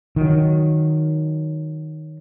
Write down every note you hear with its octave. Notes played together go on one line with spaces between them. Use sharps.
D#3 F#3